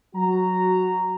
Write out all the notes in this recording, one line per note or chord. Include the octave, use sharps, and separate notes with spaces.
F#3 F#4 A#5